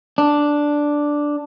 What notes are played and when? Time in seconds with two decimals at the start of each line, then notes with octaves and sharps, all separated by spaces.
0.18 D4